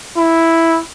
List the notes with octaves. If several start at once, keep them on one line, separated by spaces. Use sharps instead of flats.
E4